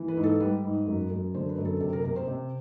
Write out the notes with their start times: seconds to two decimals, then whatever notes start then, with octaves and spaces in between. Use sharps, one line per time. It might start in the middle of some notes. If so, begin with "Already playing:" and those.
Already playing: E3
0.08 B4
0.17 G#2
0.23 A4
0.40 G3 B4
0.64 G#2
0.86 F#2
1.10 F#2
1.34 D3 C5
1.49 B4
1.58 F#2
1.65 A4
1.80 C3 A4
1.93 A#4
2.04 C3 A#4
2.16 C5
2.28 C3